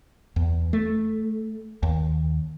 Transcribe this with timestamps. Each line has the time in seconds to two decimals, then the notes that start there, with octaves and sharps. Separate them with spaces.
0.36 E2
0.73 A3
1.83 D#2